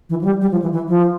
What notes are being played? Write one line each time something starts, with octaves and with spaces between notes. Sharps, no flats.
E3
F3
G3
G3
F3
E3
E3
F3